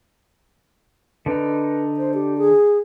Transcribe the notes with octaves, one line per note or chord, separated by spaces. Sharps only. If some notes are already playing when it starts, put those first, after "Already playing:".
D3 D#4 B4
C5
G4
G#4